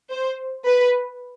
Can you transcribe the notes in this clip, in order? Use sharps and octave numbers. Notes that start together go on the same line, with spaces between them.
C5
B4